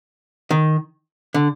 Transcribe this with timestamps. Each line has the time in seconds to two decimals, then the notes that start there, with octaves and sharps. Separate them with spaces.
0.51 D#3
1.34 D3